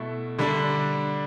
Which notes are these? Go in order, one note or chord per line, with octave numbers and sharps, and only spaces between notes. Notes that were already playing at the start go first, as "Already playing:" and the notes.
Already playing: B2 A3 E4
D3 G3 D4